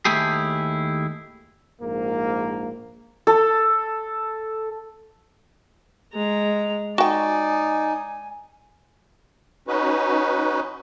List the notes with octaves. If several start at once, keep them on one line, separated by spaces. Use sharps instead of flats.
D#2 A3 E4 G4 G#4
A#1 G#2 A#3
A4
G#3 A#5
D#4 F#4 D5 G5 G#5
C#4 D#4 F#4 B4